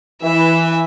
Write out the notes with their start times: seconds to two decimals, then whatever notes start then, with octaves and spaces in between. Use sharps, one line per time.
0.22 E3 E5